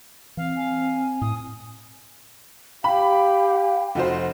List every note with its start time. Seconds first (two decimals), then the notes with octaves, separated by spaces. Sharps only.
0.37 E3 C4 F5
0.56 G#5
1.21 A2 D#6
2.84 G4 F5 G5 B5
3.95 F1 F#4 C5